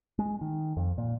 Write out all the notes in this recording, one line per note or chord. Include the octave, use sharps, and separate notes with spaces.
G#3
D#3
F2
A#2